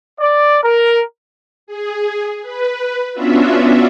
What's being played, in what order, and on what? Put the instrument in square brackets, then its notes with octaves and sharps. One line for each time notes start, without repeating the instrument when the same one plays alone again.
[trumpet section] D5
A#4
[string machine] G#4
B4
B3 C#4 D4 F4 F#4 E5